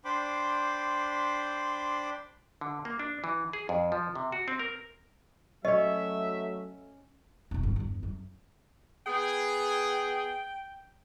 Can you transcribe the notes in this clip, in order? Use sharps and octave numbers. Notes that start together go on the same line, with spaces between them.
D4 C5 G5 B5 C6 D6
D3
A#3
D4
E3
G#4
F2
F3
C3
F#4
C4
A#4
F#3 A3 C#4 C#5 D#5 E5
E1 A2
A1 G2
E2 G2
F#2
B3 G#4 G5